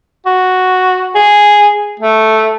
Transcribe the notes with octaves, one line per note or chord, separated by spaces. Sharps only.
F#4
G#4
A3